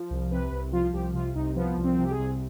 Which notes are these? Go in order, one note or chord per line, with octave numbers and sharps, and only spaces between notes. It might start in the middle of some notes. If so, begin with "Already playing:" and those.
Already playing: F3
C2
C3 B4
C2
F3 F4
C2 G4
C3 F4
C2 D#4
F3 B3
C2
C4
C3
G4
G#4
C2